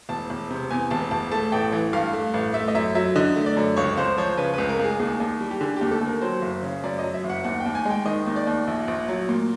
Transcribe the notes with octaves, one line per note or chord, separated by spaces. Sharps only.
E1 A5
E1
C3
E2 G#5
E1 A5
E1 A5
A3 A5
A1 G5
E3
G2 F5
A3
A1
A3 E5
D#5
F#2 E5
F#3 E5
D3 D#5
A3
D5
F#2
C#2 C#5
C#2 C5
F3 C#5
C#3 B4
C#2 B4
A#4
C#2
G#4
D#2 G#4
D#2
G3
G4
D3 G#4
D#2 G4
A4
D#2
A#4
F#3 C5
F#1
C#3
F#2 D5
D#5
F#3
E5
F#1
F#5
D#2 F#5
G5
D#2
G#5
G#3 G5
D#3 D#5
D#2
D5
D#2
A#1
A#1
F#3
A#2